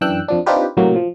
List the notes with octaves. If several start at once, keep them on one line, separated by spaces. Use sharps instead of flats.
F#2 E3 D4 G5 E6 F#6
F2 F3 D4
C4 D4 D#4 F4 G4 B4
A2 C3 F#3 A#3
F3